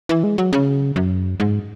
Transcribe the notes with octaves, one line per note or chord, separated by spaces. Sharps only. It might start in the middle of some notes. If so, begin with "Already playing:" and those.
E3
G#3
F#3
C#3
F#2
G#2